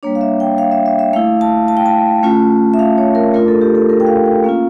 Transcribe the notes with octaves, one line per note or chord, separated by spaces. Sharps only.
G3 A#3 D4 C#5
F5
E5
G5
F5
E5
E5
E5
A3 E4 F5
A5
A5
G5
A5
A3 C#4 F4
E5
F5
C#5
A#4
A3 D4 F4 A#4
A4
G4
A4
A#4
G5
F5
G5
A#3 C#4 F4 F5